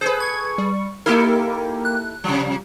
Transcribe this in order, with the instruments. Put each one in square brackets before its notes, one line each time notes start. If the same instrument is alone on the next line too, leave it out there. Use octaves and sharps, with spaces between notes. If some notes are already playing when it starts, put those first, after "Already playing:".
[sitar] G#4 A4 B4 [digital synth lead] C5
[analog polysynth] C#6 [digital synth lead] G#6
[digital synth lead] G3
[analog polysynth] A#3 G4 [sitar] D#4 E4 A4 [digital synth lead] A#4
[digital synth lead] F#6
[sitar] C3 F3 [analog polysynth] G3